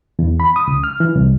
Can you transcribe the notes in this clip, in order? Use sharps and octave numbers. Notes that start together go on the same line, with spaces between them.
E2
B5
D#6
C#2
F6
E3
C2